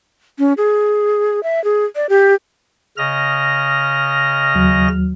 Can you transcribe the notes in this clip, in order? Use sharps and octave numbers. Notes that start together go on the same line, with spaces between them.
C#4
G#4
E5
G#4
D5
G4
C#3 D#5 F6 A#6
D#2 F#3